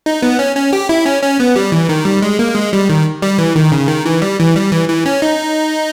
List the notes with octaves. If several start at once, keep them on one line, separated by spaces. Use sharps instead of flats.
D#4
B3
C#4
C#4
G4
E4
C#4
C#4
B3
G3
E3
D#3
G3
G#3
A#3
G#3
G3
D#3
G3
E3
D#3
C#3
D#3
E3
G3
E3
G3
E3
E3
C#4
D#4